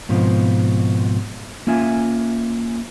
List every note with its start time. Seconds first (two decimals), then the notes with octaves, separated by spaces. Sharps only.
0.09 G#2 B2 F3 C4 F4
1.67 A#3 C#4 F4 E5 G#5